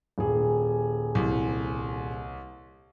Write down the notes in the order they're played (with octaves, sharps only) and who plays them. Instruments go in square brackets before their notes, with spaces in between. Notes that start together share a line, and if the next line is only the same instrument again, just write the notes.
[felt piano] D#1 G#4
[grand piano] C2